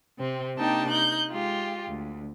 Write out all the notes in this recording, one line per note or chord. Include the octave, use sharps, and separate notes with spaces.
C3 C4
C3 A#3 D4 D#4 G5 A5
D#4 F#6 G6
G#3 F4 G4
D2